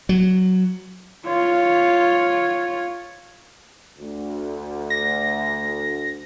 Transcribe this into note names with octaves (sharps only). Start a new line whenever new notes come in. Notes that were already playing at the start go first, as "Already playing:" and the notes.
F#3
F4 C#5
D2
A#6